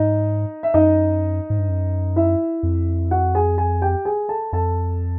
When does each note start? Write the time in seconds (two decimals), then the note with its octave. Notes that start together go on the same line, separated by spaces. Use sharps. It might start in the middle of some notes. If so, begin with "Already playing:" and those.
Already playing: G#2 D#4 D#5
0.63 E5
0.74 F#2 D#4 D#5
1.50 G#2
1.59 G2
1.69 F#2
2.16 E4 E5
2.63 F2
3.11 F#4 F#5
3.35 G#4 G#5
3.58 G#4 G#5
3.82 G4 G5
4.05 G#4 G#5
4.28 A4 A5
4.52 F2 A4 A5